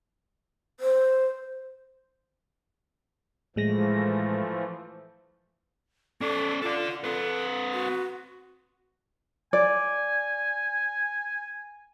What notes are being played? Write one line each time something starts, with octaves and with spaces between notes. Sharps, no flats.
C5
A2 E3 F3 G#3 A3 A#6
C#4 A4 D5
F4 A4 D5
C4 A4 B4
F#4
D5 G#5